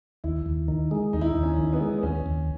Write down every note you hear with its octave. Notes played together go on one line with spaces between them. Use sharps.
D#2 E4
D#2
D#3
G#3
D#2 D#4
E4
D#4
D#2
C#4
D#3
B3
G#3
B3
D#2 C#4
D#2